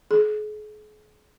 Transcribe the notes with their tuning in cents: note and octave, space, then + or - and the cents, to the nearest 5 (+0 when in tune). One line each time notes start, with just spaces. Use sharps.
G#4 +40